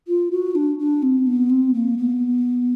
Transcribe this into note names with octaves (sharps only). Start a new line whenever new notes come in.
F4
F#4
D4
D4
C4
B3
C4
A#3
B3